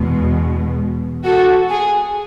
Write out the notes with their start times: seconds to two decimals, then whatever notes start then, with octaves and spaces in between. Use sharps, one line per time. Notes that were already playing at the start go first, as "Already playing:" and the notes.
Already playing: E2 B2 G#3
1.24 F#4 A4
1.69 G#4